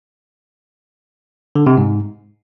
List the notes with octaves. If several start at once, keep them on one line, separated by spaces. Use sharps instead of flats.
D3
C3
G#2